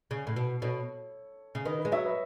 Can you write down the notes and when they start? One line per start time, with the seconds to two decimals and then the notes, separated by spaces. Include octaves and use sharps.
0.11 C#3
0.27 A2
0.36 B2
0.62 B2 A4 C#5
1.55 C#3
1.65 D#3 B4 D#5
1.79 B4 D#5
1.85 G#3
1.91 F#3 C#5 E5
2.04 B4 D#5